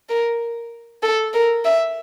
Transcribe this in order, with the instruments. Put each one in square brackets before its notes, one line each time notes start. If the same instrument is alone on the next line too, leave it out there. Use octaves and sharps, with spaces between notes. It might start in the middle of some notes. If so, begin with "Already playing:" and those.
[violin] A#4
A4
A#4
E5